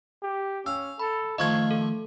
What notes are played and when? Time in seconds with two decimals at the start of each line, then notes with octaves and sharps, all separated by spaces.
0.23 G4
0.66 C#4 F5 E6
0.99 A4 B5
1.38 D#3 F3 A3 D#5 F5 C#6 G#6
1.71 A4